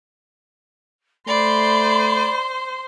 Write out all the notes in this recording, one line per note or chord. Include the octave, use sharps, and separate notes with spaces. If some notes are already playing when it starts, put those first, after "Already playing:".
A3 C5 D5 B5 C6